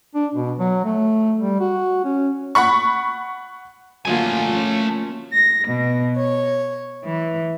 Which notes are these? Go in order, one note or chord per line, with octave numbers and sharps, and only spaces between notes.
D4
B2
F#3
A3
G3
F#4
C#4
F#5 B5 C#6
F#2 D3 F3 A3 A#3 F4 G#5
F3 C#4
A#6
B2
C#5
E3